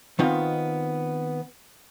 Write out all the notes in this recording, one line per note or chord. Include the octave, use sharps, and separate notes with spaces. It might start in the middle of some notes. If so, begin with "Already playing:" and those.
D#3 B3 C4 D#4 F4